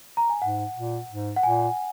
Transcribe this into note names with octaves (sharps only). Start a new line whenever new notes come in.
A#5
G#5
G#2 F#5
A#2
G#2
F#5
A#2 G#5